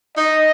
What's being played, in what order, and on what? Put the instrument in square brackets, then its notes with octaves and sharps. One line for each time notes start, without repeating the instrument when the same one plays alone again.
[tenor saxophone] D#4 [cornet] D#5